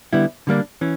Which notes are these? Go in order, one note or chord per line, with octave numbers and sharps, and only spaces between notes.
D3 G3 B3 E4
D3 G3 A#3 D4
E3 C#4